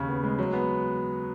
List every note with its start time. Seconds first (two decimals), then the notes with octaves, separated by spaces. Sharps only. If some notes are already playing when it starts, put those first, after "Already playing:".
Already playing: D#2 C#3
0.08 B3
0.24 G#3
0.39 F#3
0.53 B3